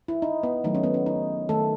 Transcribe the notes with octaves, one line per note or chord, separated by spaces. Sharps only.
E4
D#4
B3
D#3 F#3 A3 D#4
C#4
B3
C#4
D#4
D#3 A3 A4